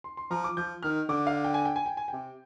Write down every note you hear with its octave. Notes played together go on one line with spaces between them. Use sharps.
C6
C6
F3 A#5
D6
F3 G6
D#3 F6
D3 D6
F5
G5
G#5
G5
G#5
G5
G#5
C3 G5